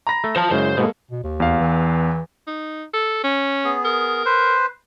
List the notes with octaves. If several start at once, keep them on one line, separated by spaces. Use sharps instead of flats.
A#5 B5 A#6
A3
F3 C5 A5
F#2 C#3 G#3 E4 C5
G#2 B2 G#3 A#3 A4
B2
D#2
E2 F5
E3
D#4
A4
C#4
B3 G#4
A#4
B4 C5